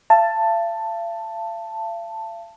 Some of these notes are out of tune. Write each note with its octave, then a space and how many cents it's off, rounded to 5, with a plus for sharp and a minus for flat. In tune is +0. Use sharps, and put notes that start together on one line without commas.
F5 -45 A5 +10